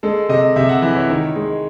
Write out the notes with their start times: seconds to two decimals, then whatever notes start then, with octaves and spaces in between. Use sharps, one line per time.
0.03 G#3 A4
0.29 C3 D#5
0.56 C3 E5
0.69 F#5
0.82 E3
0.96 C#5
1.10 D#3
1.36 G#3